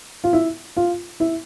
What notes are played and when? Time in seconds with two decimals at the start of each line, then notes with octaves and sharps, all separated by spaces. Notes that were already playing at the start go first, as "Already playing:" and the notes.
0.24 F4
0.33 E4
0.77 F4
1.20 E4